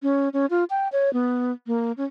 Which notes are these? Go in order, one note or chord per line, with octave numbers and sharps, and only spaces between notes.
C#4
C#4
F4
G5
C#5
B3
A#3
C#4